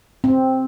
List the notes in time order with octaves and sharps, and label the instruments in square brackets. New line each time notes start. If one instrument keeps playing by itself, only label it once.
[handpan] C4